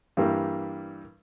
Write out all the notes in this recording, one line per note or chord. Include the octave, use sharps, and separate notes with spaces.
G2 E3 G3 A#3